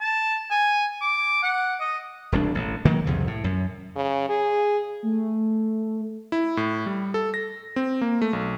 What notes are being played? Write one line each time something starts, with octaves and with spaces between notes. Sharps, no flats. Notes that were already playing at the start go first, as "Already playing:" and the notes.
A5
G#5
D6
F#5
D#5
E1 C2 C#4 D4
A1
D#3 F#3 A3 A#3
C2 F2 C#3
A2
F#2
C#3
G#4
A3
E4
A2
G3
A4
A#6
C4
A#3
A3
B1